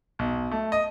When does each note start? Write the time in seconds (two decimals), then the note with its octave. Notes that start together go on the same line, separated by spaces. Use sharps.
0.19 B1
0.52 A3
0.72 D#5